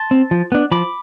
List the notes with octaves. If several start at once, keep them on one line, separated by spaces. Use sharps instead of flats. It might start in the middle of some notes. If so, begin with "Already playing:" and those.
Already playing: A5 C6
C4
F3
B3 D4
F3 B5 D6